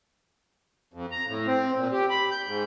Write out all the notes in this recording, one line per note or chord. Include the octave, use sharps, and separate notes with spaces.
F2
A#5
A2
C4
A#2
G4
B5
G6
G#2